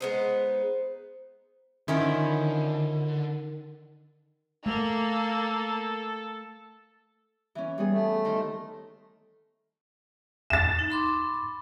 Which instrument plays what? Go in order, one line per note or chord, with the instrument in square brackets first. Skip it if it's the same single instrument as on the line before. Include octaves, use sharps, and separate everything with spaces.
[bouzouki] G#3 B3 D#4 [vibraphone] C5
[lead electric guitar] D3 [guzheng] D#3 [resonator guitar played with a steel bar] F3 C#4 E4
[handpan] A3 [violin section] A#3 [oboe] A4
[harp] E3 C#4
G3 B3 G#4
[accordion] A3
[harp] D#3 C5
[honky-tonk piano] A6 E7
[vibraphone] D#4
B5 C6 D6